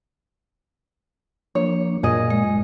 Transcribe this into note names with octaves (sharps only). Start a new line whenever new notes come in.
F3 A#3 D4 C#5
F#2 A#2 G#4 D#5
G#3